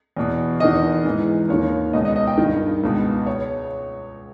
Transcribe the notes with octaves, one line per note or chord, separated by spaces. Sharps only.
E2 B2
E2 D#3 D#5
G#2 E3
D#2 D#3 C#5
C#2 B2 D#5
D#5
D#5
G5
G2 D#3
C#2 B2
C#5